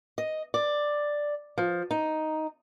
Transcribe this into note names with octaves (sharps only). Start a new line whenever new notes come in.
D#5
D5
F3
D#4